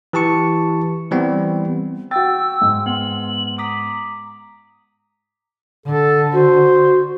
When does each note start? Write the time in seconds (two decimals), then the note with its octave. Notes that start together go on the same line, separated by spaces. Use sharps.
0.13 E3 G4 A5 C#6 C#7
1.11 E3 G3 B3 C4
2.11 F#4 G5 E6 A6
2.61 G#2
2.86 B3 F#7
3.58 A#5 D6 D#6 B6
5.86 D3 A4
6.32 F#4 C5